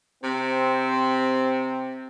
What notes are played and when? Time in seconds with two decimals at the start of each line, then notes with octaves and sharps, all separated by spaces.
0.23 C3 C4